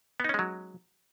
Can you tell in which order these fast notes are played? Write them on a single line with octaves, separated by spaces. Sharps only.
B3 D#4 C#4 G#3 F#3